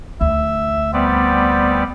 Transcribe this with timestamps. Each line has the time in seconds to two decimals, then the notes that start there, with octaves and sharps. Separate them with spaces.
0.21 D2 E5
0.93 G3 B3 C4 D5